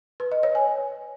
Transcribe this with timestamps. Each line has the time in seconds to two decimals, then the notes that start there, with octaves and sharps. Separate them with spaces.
0.20 B4
0.32 D#5
0.43 C#5
0.55 G#5